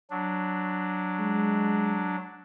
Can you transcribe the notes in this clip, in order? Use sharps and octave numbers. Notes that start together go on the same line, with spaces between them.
F#3 D4
G#3